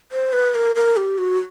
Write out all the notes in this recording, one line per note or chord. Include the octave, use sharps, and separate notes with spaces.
C5
B4
A#4
A#4
G4
F#4